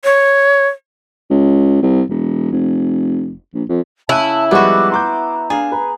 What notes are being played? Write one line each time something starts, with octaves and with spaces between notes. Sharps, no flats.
C#5
C#2
C2
E1
F1
A#1
F2
C#3 E4 A5 B5 F#6 D#7
F3 G3 G#3 B3 F#4 D6
A#5 C6 D6 G6
D4 G#4 F5
B4 A#5